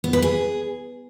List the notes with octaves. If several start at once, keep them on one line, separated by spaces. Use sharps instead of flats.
B3
B4
G#4